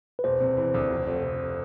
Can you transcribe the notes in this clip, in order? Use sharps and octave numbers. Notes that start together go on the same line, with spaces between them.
B4
E1 C5
C3
E3
D2
F1
F1
F1